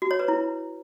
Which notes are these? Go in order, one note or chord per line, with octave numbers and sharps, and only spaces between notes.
F#4
C#5
B4
E4